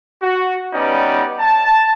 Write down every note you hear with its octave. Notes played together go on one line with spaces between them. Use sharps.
F#4
G3 B3 C#4 D#4 G4 D5
A5